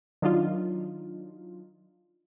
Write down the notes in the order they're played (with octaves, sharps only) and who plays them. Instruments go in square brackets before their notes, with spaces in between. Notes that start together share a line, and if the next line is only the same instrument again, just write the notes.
[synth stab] D#3 F#3 D4 D#4 F4